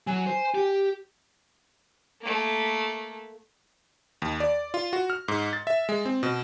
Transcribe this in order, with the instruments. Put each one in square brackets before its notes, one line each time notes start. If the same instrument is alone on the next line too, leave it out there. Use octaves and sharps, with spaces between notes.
[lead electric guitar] F#3 [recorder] G#5
[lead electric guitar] C5
G4
[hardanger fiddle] A3 A#3
[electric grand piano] D#2
D5
F4
F#4
F6
G#2
A6
E5
G#3
C4
B2